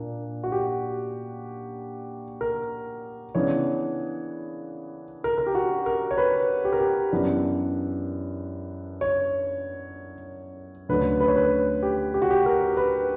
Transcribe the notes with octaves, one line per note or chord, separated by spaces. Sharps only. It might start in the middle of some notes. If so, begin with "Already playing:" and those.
Already playing: A#2 A#3 D4
F#4
G4
A#4
C#3 E3 B3 D4 C#5
A#4
A#4
G4
F#4
A#4
C#5
B4
G4
A#4
G4
F#2 E3 B3 D4
C#5
D2 D3 F#3 C#4 B4
B4
C#5
B4
G4
G4
F#4
G4
A#4
B4